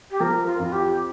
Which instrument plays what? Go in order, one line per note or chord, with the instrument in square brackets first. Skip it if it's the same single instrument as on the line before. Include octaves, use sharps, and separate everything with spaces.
[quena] G4
[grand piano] F3 [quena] A#4
[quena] F4
[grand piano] F2 [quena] F4
[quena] G4